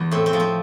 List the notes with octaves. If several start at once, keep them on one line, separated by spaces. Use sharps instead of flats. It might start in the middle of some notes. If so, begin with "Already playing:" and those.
Already playing: E2
A2 C4
C4
F3
C4